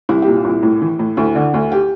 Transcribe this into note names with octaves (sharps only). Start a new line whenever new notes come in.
C2 E4
A#2 G4
F4
C2 E4
A2
E3
A2
D2 E4
D3
D2
G4